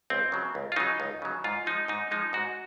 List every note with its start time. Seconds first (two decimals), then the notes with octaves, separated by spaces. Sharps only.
0.10 C#2 C4
0.32 C#3 F#3
0.55 C#2
0.72 F4
0.76 C#3 F#3 D#4
1.00 C#2
1.22 C#3 F#3
1.44 G#2 F4
1.66 F3 G#3 D#4
1.88 G#2 D#4
2.11 F3 G#3 D#4
2.33 G#2 F#4